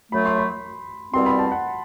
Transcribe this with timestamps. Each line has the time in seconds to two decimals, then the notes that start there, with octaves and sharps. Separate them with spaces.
0.12 F#2 F#3 A3 B5
0.25 C6
0.38 B5
1.13 C2 B2 G3 C4 C6
1.26 B5
1.39 A5
1.52 F#5